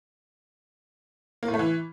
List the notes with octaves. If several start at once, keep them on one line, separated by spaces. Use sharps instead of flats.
A#3
A2
A3
E3